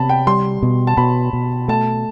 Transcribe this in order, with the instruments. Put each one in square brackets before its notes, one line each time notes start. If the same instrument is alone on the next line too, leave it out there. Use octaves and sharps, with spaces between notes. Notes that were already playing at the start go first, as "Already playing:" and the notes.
Already playing: [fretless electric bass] C3 B3 [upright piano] A5 B5
[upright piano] G5
[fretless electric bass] G3 [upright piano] C6
[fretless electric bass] B2
[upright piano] A5
[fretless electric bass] B2 [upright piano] B5
[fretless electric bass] B2
[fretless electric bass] A3 [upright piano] A5